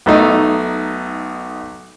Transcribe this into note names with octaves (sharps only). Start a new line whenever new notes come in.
B1 A3 D#4